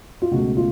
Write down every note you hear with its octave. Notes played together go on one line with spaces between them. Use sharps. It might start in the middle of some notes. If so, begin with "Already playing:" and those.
F4
C#2 B2 A3 F#4
F4